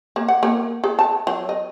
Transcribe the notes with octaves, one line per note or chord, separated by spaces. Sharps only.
A#3
F#5
A#3
G#4
A5
F#3
D#5